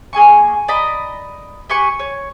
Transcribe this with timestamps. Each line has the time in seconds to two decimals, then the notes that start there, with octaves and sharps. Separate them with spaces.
0.13 A#3 G#4 G#5 C#6
0.68 D5 D#5 A#5 B5
1.70 G4 B4 G#5 C#6
1.99 C#5